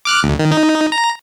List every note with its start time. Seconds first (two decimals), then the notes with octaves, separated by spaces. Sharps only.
0.05 D6 F6 F#6
0.23 D2
0.39 D#3
0.51 D#4
0.92 A#5